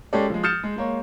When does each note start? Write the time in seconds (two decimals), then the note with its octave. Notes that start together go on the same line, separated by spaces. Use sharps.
0.13 G#3 C#4 G4 A4 C#5 D5
0.30 F3 G#3
0.43 D#6 F6 G6 A6 C#7 E7
0.64 G#3
0.76 G#3 A#3 C#5